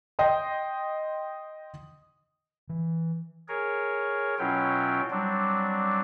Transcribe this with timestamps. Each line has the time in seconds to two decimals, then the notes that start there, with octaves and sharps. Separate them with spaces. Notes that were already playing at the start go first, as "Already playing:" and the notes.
0.19 D#5 G5 C6
2.69 E3
3.48 G#4 A#4 C#5
4.39 B2 F#3 C#4 E4 F4 G5
5.10 F#3 G3 C4 D4